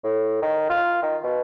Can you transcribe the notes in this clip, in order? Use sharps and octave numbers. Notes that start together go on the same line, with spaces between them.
A2
D#3
F4
D#3
B2